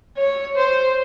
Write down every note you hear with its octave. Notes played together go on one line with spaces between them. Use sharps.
C#5
C5